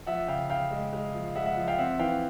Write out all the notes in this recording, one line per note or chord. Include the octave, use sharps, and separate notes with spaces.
F3 E5 F#5
C#3 F5 G5
C#3 F5 G5
G#3
G#3
F3
G#3 E5 F#5
E5 F#5
F3
F5 G5
C4 E5 F#5
E3 F5 G5